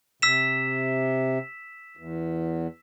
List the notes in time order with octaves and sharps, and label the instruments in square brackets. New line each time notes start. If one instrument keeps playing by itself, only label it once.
[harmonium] C3 [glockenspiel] E6 B6 E7
[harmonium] E2